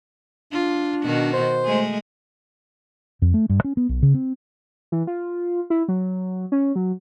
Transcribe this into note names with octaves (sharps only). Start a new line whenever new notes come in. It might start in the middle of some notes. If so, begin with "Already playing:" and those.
D4 F4
B2 D#3 F#4
C5
G#3 A3 G#4
F2
A3
G2
C#4
B3
B1
C#3
C4
E3
F4
E4
F#3
C#4
F#3